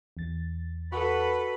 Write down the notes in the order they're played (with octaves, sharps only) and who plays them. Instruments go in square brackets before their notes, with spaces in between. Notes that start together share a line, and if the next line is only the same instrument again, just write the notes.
[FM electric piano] E2 A6
[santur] F#4 [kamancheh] A4 B4 [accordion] B5